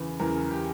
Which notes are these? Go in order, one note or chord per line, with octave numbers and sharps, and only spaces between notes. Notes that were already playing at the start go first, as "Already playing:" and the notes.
Already playing: E2 C#3 E3 B4
E2 C#3 E3 A#4
G4